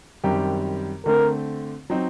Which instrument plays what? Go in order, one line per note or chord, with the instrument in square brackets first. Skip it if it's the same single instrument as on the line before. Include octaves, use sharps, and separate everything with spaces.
[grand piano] F#2 D#3 G3 C4 G4
[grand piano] D3 A3 C4 [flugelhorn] A#4
[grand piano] F#3 C4 D#4